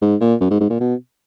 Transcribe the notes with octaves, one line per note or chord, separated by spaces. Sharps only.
G#2
A#2
F#2
G#2
G#2
A#2
B2